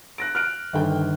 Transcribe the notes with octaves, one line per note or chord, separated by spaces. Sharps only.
F#6 A#6 D7
F6 F#6 D7
G1 D#3 A4 G5